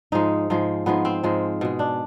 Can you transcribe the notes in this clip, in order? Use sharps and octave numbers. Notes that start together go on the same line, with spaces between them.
G#2 F3 G#3 D#4
G#2 F3 G#3
G#2 F3 G#3 B3
C4
G#2 F3 G#3
B2 G#3
D4